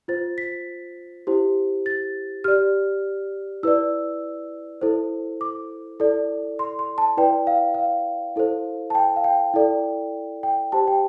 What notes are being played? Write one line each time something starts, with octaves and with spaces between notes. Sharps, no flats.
F4 C5 A6
B6
E4 G4 C5
A6
G4 D5 F6
E4 B4 D5 E6
E4 A4 C5
D6
E4 A4 D5
C6
C6
A5
E4 B4 D5 G5
F5
F5
E4 A4 C5
A5
G5
F5
G5
E4 A4 D5
G5
G4 C5 A5
G5